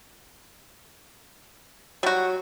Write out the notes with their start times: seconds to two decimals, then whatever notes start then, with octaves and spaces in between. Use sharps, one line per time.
2.03 F#3 G3 F#4